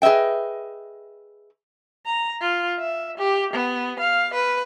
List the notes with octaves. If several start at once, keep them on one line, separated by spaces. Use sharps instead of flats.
G#4 B4 D#5 E5 G5
A#5
F4
E5
G4
B3
F5
B4